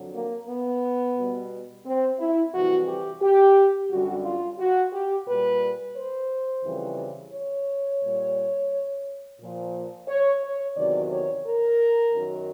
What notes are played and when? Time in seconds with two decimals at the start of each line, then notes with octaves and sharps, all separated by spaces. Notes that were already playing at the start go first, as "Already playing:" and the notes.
Already playing: F2 D3 F#3
0.14 A#3
0.48 B3
1.16 B2 G3
1.85 C4
2.19 E4
2.54 F2 C3 E3 G3 F#4
2.87 G4
3.21 G4
3.91 F#2 D3 G3 F#4
4.25 F4
4.59 F#4
4.93 G4
5.27 A#2 G3 B4
5.96 C5
6.64 F2 C#3 E3 G3
7.33 C#5
8.02 A#2 G3
9.40 A#2 F3
10.08 C#5
10.42 C#5
10.76 E2 C3 D#3 F#3 D5
11.11 C#5
11.45 A#4
12.13 F#2 D#3 F#3